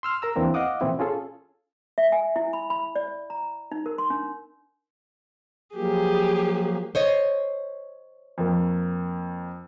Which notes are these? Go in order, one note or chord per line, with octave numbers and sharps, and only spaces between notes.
C6 E6 F6
A#4 A#5 E6
E2 E3 A#3 C4 D4
D#5 F5 F#5 D6 D#6
A#2 E3 C4 E4
C#4 F4 G#4 A4
E5
G#5
E4
B5
B5
D5
A#5
D#4
A#4
C6
D4
F3 F#3 A#3 G4 G#4
C5 C#5 D#5
F2 A#3